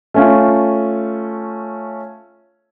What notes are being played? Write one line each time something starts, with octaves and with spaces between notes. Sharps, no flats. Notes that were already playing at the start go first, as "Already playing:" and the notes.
A3 C#4 F4